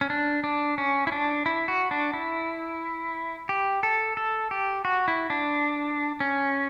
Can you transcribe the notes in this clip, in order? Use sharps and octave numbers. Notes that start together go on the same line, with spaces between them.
C#4
D4
D4
C#4
E4
D4
E4
F#4
D4
E4
G4
A4
A4
G4
F#4
E4
D4
C#4